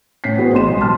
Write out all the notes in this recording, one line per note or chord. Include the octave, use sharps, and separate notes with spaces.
A2 C#4 B6 C7
B3 C4 F#4 G#4 B4 C5
A1 C6 E7
B1 G#3
A5 C6 F6